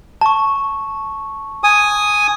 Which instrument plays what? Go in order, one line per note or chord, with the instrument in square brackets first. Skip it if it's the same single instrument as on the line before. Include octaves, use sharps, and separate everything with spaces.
[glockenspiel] A5 C#6
[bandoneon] G#5 D#6